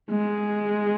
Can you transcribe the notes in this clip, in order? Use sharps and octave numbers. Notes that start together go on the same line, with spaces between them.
G#3